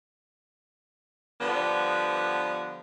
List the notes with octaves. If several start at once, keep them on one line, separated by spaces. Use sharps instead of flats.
D3 F3 G3 B3